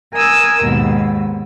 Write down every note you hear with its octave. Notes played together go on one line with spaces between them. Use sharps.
A#4 G#5 D#6 E6
D#2 G#2 B2